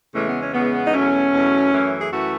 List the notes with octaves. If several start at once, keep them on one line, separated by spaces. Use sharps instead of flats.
E2 C#3 E3 G#3 A3
B3
C#4
E2 C#3 E3 G#3 B3
D#4
E2 B2 F#3 A3 C#4
E2 B2 F#3 A3
F#2 E3 A3
G#4
F#2 E3 A3 F#4